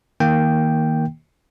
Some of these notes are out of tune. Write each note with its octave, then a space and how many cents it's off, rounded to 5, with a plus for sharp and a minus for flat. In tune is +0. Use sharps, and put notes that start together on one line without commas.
D#3 +15 A#3 +0 G5 +0